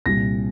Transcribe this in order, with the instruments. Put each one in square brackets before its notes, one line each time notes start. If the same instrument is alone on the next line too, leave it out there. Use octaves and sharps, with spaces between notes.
[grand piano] C2 A#2 G3 A#6